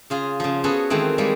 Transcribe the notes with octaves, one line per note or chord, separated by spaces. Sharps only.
C#3 F4 G#4
C#3 F3
B3 C#4 F#4 G#4 A4 C#5
D#3 E3 G#3 A3 C4
G3 G#3 A#3